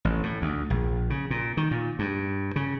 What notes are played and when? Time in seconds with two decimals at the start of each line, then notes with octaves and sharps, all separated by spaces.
0.05 A1
0.23 A2
0.42 D2
0.70 A#1
1.10 C#3
1.31 A#2
1.57 D#3
1.71 A#2
1.99 G2
2.56 C#3